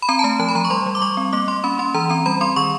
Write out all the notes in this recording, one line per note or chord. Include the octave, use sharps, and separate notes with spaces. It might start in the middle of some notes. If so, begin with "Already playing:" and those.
B5
C4 A#5
A5
A3 A#5
F3 A5
B5
F3 A#5
C#6
G3 C6
G3
D6
G3 C#6
C4
A#3 D6
A#3 C6
C#4 B5
C#4 C6
E3 A#5
C4 A#5
G3 B5
C4 C6
D#3 C#6